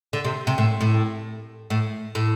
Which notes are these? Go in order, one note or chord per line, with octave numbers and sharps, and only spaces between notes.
D3
C3
C3
A2
A2
A2
A2